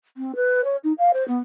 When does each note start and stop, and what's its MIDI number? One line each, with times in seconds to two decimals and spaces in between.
0.17 0.35 60
0.36 0.61 71
0.64 0.76 73
0.84 0.92 63
0.98 1.11 77
1.13 1.26 72
1.28 1.38 59